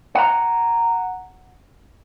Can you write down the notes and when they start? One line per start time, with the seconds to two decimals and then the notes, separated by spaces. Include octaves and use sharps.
0.15 F#5 A#5